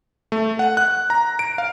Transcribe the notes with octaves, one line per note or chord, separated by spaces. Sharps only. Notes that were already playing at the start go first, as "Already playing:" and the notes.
A3
F#5
F#6
A#5
D7
F5